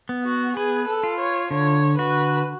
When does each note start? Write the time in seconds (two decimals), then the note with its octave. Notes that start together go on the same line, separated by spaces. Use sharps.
0.09 B3
0.25 F#4
0.57 G#4 B4
0.88 A4
1.03 F4
1.20 C#5
1.51 D3 C#5
1.98 F#4 B4